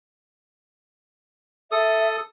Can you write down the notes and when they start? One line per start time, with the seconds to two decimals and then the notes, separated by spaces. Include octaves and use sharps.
1.72 A4 E5 D#6